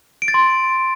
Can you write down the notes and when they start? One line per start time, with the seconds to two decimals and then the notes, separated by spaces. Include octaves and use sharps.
0.22 D7
0.28 A6
0.34 C6